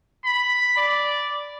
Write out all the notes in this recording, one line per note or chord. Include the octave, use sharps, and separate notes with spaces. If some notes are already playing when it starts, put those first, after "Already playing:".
B5
D5